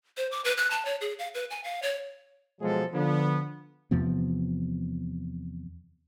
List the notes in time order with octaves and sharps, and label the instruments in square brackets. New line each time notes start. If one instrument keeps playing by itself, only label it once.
[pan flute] C5
D6
B4
F#6
A5
C#5
G#4
F5
B4
G#5
F5
C#5
[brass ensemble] B2 F3 F#3 G#3 G#4 A4
D3 F3 B3
[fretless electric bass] E2 C3 F3 B3